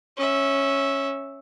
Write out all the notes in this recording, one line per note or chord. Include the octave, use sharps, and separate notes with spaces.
C#4 E5